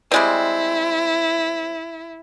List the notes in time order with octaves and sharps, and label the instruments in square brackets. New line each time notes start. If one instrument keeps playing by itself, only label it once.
[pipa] G3 G#3 C4 [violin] E4